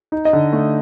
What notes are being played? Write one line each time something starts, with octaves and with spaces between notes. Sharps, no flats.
D#4
D#5
D3
A3